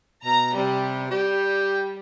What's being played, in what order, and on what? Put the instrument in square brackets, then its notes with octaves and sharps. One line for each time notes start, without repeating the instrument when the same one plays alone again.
[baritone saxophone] B2 [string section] A#5
[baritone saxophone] C3 [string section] G3
[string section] G3 [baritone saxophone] G4